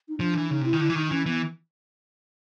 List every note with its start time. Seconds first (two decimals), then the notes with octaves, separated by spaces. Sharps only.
0.09 D#4
0.20 F3 D4
0.35 E3
0.50 C#3 D#4
0.61 C3 E4
0.73 D#3
0.80 D3 E4
0.90 E3
0.95 D#3 D#4
1.11 E3 C#4
1.26 E3 B3